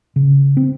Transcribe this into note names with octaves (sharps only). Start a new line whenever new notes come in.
C#3
C4